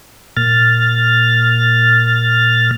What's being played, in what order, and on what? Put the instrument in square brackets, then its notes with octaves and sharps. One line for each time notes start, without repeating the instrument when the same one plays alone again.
[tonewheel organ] A#2 F6 A6